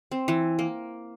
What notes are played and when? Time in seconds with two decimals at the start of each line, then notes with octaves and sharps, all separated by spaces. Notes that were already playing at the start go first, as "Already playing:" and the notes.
0.11 C4
0.28 E3
0.59 A#3